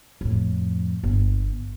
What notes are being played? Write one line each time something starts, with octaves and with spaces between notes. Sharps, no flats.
F2 A2
G1